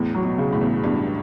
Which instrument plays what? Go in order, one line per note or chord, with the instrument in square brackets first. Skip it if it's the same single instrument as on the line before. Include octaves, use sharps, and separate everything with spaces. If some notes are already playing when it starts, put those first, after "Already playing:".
Already playing: [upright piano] E2 [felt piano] A2
[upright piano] F#3
[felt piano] B2
[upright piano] C#3
[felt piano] A2
[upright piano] E2
[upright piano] E2 [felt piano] G2